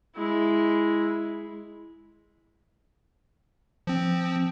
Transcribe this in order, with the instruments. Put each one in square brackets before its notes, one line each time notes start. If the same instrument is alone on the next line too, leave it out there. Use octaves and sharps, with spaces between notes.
[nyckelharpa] G#3 E4
[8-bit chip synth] F3 C4